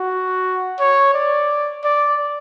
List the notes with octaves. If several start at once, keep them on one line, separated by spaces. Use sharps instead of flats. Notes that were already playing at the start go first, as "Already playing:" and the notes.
Already playing: F#4
C#5
D5
D5